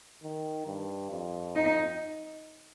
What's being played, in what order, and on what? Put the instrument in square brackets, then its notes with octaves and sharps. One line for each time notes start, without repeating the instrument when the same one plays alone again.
[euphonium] D#3
G2
F2
[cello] D#4